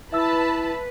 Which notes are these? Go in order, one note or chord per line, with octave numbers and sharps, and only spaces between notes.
E4 B4 E5 A5 B5 E6